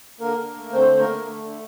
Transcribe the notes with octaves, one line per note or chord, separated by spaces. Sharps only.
D3 A#3 A#4
D3
A3
D3 C4 C5
A3
A#3 A#4
D3
A3
D3